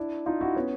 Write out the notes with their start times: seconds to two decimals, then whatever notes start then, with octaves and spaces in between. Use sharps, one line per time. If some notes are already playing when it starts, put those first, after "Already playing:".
Already playing: D4 E4
0.26 D#4 F4
0.41 E4 F#4
0.55 B3 C#4